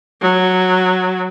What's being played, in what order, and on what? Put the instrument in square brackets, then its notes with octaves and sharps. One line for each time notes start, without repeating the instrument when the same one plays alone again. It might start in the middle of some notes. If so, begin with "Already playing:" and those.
[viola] F#3